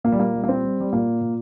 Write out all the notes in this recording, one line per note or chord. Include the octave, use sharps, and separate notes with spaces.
A#2 A#3
G3
A#3
G3
A#3
C4
G3
G3
A#2 A#3
A#2